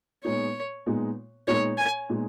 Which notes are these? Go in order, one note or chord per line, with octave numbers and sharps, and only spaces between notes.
A#2 G#3 B3 D#4 C#5
A#2 G#3 B3 D#4
A#2 G#3 B3 D#4 C#5
G#5
A#2 G#3 B3 D#4